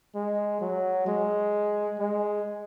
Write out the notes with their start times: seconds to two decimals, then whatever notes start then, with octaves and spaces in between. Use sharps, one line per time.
0.15 G#3
0.61 F#3
1.07 G#3
1.99 G#3